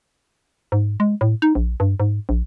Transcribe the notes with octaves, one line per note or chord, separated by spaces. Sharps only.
G#2
G#3
A2
D#4
A#1
G2
G#2
A#1